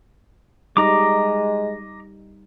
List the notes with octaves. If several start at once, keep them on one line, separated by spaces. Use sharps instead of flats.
G3 G#3 D#4 D#5 A#5 D6